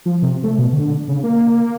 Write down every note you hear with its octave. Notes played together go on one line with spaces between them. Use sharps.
F3
C3
A3
B2
D3
C#3
A#3